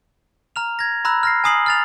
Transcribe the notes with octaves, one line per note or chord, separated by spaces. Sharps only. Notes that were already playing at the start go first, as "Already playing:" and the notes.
A#5 F6 F7
G#6 A#6
A#5 B5 E6 F#6
F6 A#6 C7
G#5 A#5 D#6 C7 F#7
F6 A6 F7